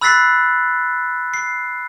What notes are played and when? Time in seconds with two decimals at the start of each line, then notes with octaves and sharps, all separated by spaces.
0.01 B5 E6 F#6 A6 B6 C7
1.34 C7